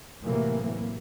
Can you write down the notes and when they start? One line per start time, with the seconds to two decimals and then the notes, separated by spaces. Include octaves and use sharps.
0.25 A2 C3 E3 F#3 A#3